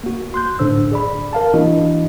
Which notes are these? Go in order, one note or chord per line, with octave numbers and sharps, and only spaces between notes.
A#3 F#4
C6 F#6 G6
A2 D3 D4 C5 E6
G#4 D5 B5
A#4 F5 A5
E3 A#3 D4 E4 F#4 D#5